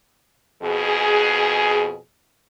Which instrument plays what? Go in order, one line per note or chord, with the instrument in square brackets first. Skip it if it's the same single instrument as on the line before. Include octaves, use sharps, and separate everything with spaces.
[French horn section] F2 B2 G#4